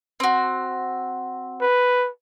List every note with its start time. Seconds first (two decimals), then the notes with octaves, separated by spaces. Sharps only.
0.20 C4 F#4
1.62 B4